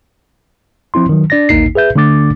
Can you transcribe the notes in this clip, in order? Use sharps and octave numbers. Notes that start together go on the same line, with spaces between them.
F3 C4 E4 C6
D#3 F#3
D4 D5 A6 A#6
A1 D#2 A#3 D#4 C7
G#4 B4 E5 G6
D3 A3 D4 D6 A6